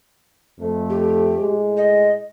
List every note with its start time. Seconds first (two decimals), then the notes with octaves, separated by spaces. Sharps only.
0.59 F2 A3
0.90 G4
1.38 A2 G#3
1.77 D#5